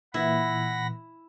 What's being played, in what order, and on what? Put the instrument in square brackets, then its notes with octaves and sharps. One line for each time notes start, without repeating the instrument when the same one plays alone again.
[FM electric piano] A#2 E3 [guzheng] E4 [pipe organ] F#5 B5 A#6